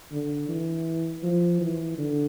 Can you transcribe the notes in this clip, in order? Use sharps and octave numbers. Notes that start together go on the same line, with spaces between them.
D3
E3
F3
E3
D3